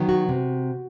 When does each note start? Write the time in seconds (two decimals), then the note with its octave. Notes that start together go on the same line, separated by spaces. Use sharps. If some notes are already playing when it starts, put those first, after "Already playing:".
Already playing: D#3 F#3 B3
0.09 F#4
0.29 C3